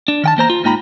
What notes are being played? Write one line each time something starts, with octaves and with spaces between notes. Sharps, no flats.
D4
D#3 G5 A5
E2 A#3 C5 A#5
F4
G#2 A#3 D#4 G5 A#5 B5